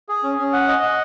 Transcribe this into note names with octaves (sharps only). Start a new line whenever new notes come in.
G#4
C#4
C#4
F#5
D#5
F#5